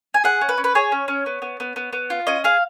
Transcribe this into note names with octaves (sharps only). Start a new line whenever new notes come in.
G#5
G#4 F#5
C#4
B4
C#4
B4
G#4 C#5
C#4
C#4
B3
B3
B3
B3
B3
F4
C#4 D#5
G#4 F5